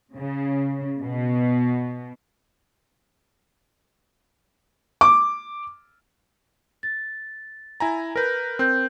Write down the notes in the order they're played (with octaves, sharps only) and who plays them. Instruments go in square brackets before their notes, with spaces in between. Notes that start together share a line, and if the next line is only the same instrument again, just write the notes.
[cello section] C#3
B2
[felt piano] D6
[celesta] A6
[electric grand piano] E4 G#5 A#5
[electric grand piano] A#4 B4 [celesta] F#6 G6 A#6
[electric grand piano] C4 [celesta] A#4 G6